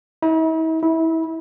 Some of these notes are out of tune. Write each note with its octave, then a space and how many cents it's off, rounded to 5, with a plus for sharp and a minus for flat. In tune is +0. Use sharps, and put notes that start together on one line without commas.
E4 -45
E4 -25